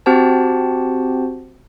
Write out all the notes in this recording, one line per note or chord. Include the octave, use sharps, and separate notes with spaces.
C4 F#4 G4 C5 F#5 A5